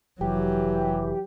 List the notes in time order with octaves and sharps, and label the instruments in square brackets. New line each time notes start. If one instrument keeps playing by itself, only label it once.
[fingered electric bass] F1 [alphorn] E3 [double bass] F#3 [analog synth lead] G4